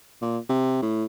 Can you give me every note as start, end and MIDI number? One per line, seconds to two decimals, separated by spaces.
0.21 0.38 46
0.49 0.80 48
0.82 1.05 45